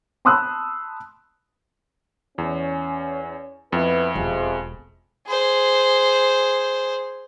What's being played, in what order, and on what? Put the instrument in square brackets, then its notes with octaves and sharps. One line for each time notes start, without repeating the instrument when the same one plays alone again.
[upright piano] A5 B5 C6 D#6 E6 F#6
[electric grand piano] E2 [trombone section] C#4
[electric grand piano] F2 [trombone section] B3 E4 B4
[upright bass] E1 [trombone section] C3 F4 G#4
[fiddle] G#4 C5